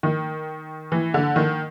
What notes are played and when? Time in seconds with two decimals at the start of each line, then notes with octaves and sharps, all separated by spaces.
0.03 D#3
0.92 E3
1.14 D3
1.36 D#3